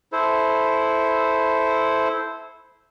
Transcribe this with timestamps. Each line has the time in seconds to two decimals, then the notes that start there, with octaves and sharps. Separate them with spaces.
0.12 E4 A4 C5